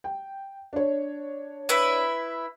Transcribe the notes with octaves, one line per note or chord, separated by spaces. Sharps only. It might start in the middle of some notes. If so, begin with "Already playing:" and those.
G5
D4 C#5
E4 B4 E5